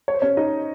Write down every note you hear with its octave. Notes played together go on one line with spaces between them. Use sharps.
C#5
C5
C#4 C#5
D#4 D#5